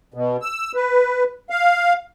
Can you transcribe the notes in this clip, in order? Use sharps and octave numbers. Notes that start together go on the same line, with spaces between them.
B2
E6
B4
F5